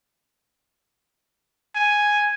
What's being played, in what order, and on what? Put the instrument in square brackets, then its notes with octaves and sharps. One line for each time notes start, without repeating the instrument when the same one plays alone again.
[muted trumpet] G#5